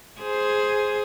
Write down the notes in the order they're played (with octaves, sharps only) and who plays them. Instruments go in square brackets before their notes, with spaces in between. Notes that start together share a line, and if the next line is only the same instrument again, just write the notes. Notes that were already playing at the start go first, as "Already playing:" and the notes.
[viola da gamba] G#4 C5